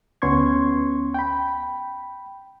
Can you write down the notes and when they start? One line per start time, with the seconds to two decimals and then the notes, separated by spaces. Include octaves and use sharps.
0.22 D2 B3 C#4 C6 C#6 G#6
1.14 G5 B5